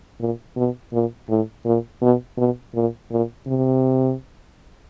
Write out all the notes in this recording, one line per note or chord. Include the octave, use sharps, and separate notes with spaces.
A#2
B2
A#2
A2
A#2
B2
B2
A#2
A#2
C3